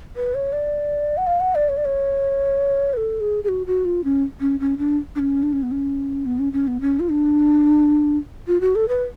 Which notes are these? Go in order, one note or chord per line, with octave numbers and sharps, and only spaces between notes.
B4
C#5
D5
F#5
F5
F#5
D5
C#5
D5
C#5
B4
A4
G#4
G#4
F#4
F#4
F4
C#4
C#4
C#4
D4
D4
C#4
D4
C#4
B3
C#4
B3
C#4
C#4
B3
C#4
F4
D4
F4
F#4
A4
B4